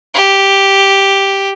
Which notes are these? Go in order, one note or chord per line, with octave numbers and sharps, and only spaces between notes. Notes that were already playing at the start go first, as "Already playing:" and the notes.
G4